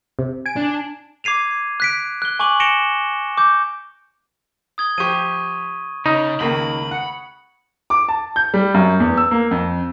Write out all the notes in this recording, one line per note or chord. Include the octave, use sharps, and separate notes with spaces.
C3
G#5 D7
D4
D6 G#6 C7 D#7 F7
F#6 B6 D7
F#6 G7
G#5 C#6 D6 F#7
A#6 C#7 D7 E7 F7 G7
D6 G6
D#6 G#6 G7
F3 G4 C#6 D#7
C#3 D#4 B5
C#2 D#3 A#3 B5
F#5 C#7
D6
A5
G6
G3
F#2
E2
E6
A#3
F2